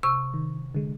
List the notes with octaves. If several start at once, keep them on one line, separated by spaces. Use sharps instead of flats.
C3 C#6
D#3
D3 G#3